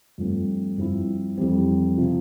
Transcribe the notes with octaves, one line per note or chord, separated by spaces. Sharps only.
G2 F3 A3 C4
G2 F3 C4 E4
F2 E3 G3 C4
C3 F3